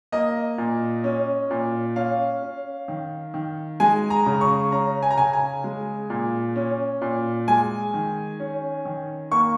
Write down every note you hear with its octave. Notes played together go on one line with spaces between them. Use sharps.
A#3 D#5
A#2
C#4
A#2
C#4 F5
C#4
D#3
D#3
G#3 G#5
A#5
C#3
C#6
C#4 A#5
G#5
A#5
C#3 G#5
G#5
G#3
A#2
C#4
A#2
G#3 G#5
D#3
C#4
D#3
A#3 C#6